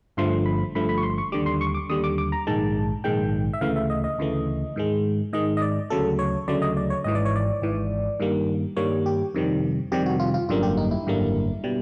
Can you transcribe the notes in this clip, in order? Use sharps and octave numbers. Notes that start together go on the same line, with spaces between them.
G1 G2 D3 F3 A3 C6
B5
G1 G2 D3 F3 A3 B5
B5
C#6
C6
C#6
D#2 D3 G3 D6
C6
C#6
D6
D#2 D3 G3 D#6
D6
D6
A#5
A#1 G#2 D#3 G#3 A5
A#1 G#2 D#3 G#3 G5
E5
D2 C#3 E3 A3 F5
E5
D#5
D#5
D2 C#3 E3 A3
G#2 D#3 G#3
G#2 D#3 G#3 D#5
D#5
D5
D2 C#3 F#3 A3 A4
C#5
D2 C#3 F#3 A3 D5
D#5
D5
C#5
G#1 G#2 E3 D#5
D5
C#5
D5
G#1 G#2 E3
G2 D#3 G3 A#3
G2 D#3 G3 A#3 C#5
G4
F2 C3 D#3 G3
F2 C3 D#3 G3 G4
F#4
F4
F4
G#1 F#2 D3 G3 A#3 F4
G4
D#4
E4
G#1 F#2 D3 G3 A#3
B2 G3